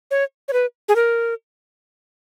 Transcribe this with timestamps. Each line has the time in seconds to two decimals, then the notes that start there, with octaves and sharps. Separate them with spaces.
0.11 C#5
0.48 C#5
0.53 B4
0.89 G#4
0.96 A#4